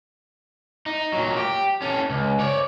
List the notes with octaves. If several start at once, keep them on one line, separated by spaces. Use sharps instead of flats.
D#4
A#2 F#3
G4
C#4 A4
C#2
C#5 D5